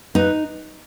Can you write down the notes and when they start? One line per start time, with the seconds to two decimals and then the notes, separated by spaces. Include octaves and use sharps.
0.15 D#4 B4